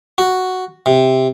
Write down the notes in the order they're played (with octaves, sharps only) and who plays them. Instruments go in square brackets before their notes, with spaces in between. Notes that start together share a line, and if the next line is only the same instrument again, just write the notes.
[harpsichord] F#4
C3